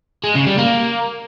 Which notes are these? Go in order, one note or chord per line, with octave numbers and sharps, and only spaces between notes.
G#3
C#3
G3
A#3